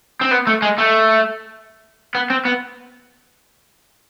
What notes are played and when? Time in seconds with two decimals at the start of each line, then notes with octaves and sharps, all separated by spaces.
0.21 C4
0.31 B3
0.47 A3
0.62 G#3
0.78 A3
2.15 B3
2.30 C4
2.45 B3